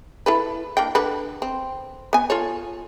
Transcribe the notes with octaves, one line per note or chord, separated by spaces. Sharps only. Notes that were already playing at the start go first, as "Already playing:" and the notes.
E4 A4 B4
A#3 D4 G5
D3 B4
C4
B3 G#5
F4 A4 C#5